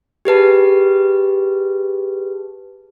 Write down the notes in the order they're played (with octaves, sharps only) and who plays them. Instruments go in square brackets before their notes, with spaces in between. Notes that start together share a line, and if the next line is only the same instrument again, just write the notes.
[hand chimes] G4 G#4 B4 A5